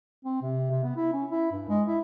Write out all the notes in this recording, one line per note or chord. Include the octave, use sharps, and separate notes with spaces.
C4
C3
C3
B3
E4
C#4
E4
G2
G#3
E4